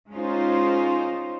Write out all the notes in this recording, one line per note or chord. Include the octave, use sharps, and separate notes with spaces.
G#3 C#4 D#4 F4 C5